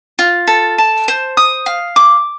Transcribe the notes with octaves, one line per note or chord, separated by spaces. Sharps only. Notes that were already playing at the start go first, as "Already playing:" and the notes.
F4
A4
A5
C5
D#6
F5
D6